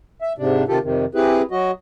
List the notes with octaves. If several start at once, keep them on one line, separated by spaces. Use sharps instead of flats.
E5
G#2 C3 D4
C3 D#3 F4 G4 A4
F2 C3 D#3
C4 E4 G4 G#4 B4
F#3 F#4 D#5